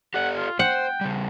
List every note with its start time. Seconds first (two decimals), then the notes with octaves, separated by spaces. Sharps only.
0.14 G4 A4 D5 F#5
0.37 F4
0.59 C5 F#5 G5
1.01 C#3 G3